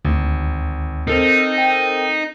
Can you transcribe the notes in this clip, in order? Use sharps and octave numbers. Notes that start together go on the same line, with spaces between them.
G#1 D2
C4 D#4 A4 A#4
G5